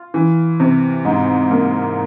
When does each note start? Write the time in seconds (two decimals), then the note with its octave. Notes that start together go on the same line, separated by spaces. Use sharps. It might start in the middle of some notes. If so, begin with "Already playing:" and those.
Already playing: F4
0.14 E3
0.60 C3
1.05 G#2
1.50 A#3